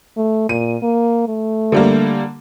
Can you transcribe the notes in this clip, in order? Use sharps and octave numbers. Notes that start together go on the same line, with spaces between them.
A3
A#2 D#7
A#3
A3
D3 G3 A#3